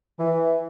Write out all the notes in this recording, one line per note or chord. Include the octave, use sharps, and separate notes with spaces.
E3